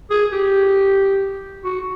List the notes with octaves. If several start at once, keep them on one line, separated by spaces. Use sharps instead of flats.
G#4
G4
F#4